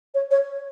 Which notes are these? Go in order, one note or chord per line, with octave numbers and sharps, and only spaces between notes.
C#5
C#5